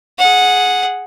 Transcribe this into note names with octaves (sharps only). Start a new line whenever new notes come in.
G#4 F#5